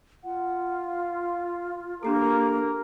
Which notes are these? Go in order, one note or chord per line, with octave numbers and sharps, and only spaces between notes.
F4 F#5
F5
A#3 D4 G4 A4 A#4 A#5